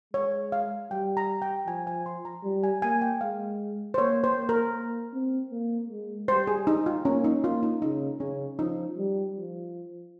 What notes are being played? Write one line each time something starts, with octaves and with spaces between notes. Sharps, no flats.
G#3 C#5
F5
G3 G5
A#5
G5
F3 G#5
G#5
C6
A#5
G3
G#5
A#3 G#5
G5
G#3 F5
C5
A#3 C#5
C5
A#3
A#4
A#3
C4
A#3
G#3
G3 C5
G#4
D#4
F4
A#3 C#4
D#4
A#3 F4
D#4
C#3 D#4
C#3 C#4
F3 D#4
G3
F3